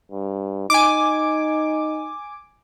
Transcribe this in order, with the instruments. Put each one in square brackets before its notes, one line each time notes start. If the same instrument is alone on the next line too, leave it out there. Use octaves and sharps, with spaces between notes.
[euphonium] G2
[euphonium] D#4 [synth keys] G#5 D6